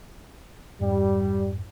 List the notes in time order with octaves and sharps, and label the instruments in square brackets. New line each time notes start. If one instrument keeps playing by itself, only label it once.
[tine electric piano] F2 G#2 [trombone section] G3